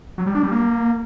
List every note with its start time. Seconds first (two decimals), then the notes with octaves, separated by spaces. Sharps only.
0.18 F#3
0.26 G3
0.35 D4
0.43 G3
0.52 A#3